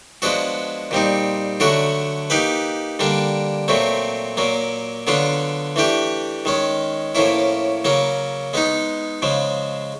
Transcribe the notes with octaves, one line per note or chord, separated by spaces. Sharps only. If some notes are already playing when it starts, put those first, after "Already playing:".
F3 G#3 B3 D4 F#4
A#2 G3 C4 D#4
D3 F#3 A3 D4 F#4
A#3 D#4 G4 B4
D3 G3 A#3 D4
A#2 F#3 A3 C4
A#2 F#3 A#3
D3 F#3 B3 D4 F4
E3 A3 D4 G4
D#3 G#3 C#4
A2 F3 A#3 C#4 E4
C#3 F#3 A#3 C#4
G#3 B3 D#4
C#3 F3 G#3